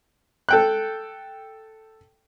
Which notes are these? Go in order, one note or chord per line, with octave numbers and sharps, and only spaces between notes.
A4 G5 F#6